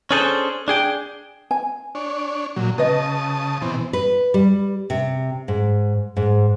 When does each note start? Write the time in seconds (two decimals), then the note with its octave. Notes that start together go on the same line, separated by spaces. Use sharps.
0.11 C#4 D4 G#4 A4 B4 C5
0.68 D4 G#4 G5
1.51 G#5
1.95 D4 C#5
2.56 A#2 F#3
2.78 C#3 B4 D#5 A5 D#6
3.62 B2 E3 C4
3.93 B4
4.34 G3
4.90 C3
5.48 G#2
6.17 G#2